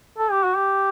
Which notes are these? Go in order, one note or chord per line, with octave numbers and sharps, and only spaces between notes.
A4
G4
F#4
G4